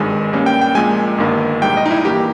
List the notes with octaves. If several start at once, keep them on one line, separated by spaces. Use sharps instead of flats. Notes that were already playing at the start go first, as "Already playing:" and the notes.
Already playing: G#1 G2 D#3 G#3 G#5
G2 G3 A#3 C#4
G5
G5
A#1 A#2 G#3 G#5
G1 G2 D#3 A#3
A#1 G#2 G3 G5
D#5
D#4
E4
G2 E3 A#3 G4